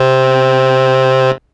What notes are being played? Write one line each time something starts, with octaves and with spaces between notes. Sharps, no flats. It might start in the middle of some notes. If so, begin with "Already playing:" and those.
Already playing: C3 C4